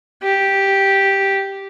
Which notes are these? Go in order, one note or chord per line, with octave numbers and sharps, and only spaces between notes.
G4